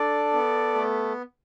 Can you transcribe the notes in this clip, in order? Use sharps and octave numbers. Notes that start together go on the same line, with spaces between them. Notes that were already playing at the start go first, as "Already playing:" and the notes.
Already playing: D4 A4 D5
B3
A3